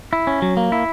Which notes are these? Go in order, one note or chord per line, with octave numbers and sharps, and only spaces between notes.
E4
C#4
F#3
A#3
E4